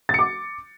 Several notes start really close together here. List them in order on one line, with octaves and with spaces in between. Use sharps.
A6 C#7 D6